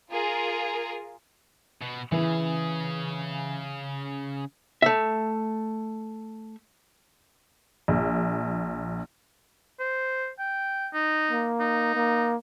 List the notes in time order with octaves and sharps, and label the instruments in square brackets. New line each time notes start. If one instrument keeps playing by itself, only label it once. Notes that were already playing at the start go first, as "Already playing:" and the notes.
[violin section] F4 G#4 A#4
[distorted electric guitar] B2
[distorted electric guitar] C#3 G#4 [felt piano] E3
[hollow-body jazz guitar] A3 E5
[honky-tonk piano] A#1
[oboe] C5
G5
D#4
[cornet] A#3
[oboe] D#4
[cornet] A#3